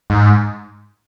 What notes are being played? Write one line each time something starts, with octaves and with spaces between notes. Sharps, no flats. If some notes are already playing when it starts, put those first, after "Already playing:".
G#2